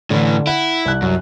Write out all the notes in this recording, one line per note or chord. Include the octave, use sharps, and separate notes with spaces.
A2 D3 E3
E4 F#5
C2 F#6
F#2